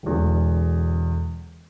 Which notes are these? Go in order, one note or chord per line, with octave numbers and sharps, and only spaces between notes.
E1 E2 D3